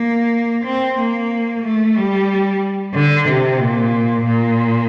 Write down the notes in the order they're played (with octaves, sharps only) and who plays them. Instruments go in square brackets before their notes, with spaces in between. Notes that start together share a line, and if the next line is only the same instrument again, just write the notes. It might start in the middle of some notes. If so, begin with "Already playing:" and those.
Already playing: [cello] A#3
C4
A#3
A3
G3
D3
C3
A#2
A#2